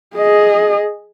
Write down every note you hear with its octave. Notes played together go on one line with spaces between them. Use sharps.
G#4 D#5